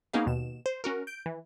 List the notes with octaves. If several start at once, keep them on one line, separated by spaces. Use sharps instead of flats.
A#3 B3 C#4 D#4 G#4 F5
D#2 B2 E7
C5
C#4 F#4 A#4
G6 D7
E3